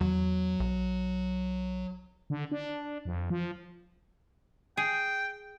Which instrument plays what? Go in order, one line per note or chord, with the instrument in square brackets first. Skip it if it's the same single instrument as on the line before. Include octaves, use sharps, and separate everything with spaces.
[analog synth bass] E2 [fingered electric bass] F#3
[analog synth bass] B1
[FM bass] D3
D4
F2
F3
[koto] G#4 [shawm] G5